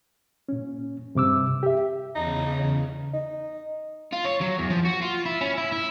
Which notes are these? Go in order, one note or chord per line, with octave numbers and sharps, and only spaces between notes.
A#2 C#4
G2 C3 D6 E6
G4 E5
E2 C#3 D#4
D#4
F4
C#5
F#3
E2
F3
F#4
F4
E4
C#4
E4
E4